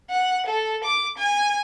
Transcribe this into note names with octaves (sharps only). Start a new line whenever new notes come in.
F#5
A4
D6
G#5